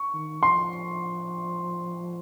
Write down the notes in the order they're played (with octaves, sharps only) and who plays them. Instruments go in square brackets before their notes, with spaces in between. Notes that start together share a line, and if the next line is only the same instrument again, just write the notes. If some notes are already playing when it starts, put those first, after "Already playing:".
Already playing: [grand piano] C#6
[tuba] D#3
[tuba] F3 [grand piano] C6